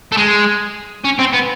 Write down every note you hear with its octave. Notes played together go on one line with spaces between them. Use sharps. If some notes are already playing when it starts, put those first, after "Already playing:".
A3
G#3
C#4
C4
B3